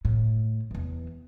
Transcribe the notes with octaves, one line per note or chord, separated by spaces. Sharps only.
A2
E2 E3